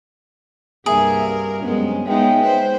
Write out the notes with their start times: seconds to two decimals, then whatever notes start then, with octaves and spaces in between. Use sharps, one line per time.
0.86 C2 G2 A#3 G#4 A#4 E5
1.63 F#2 C3 G#3 B3 C#4
2.06 G#3 B3 D#4 C#5 E5 G5
2.42 B4 C5